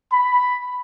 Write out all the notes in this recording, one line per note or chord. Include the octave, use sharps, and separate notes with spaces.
B5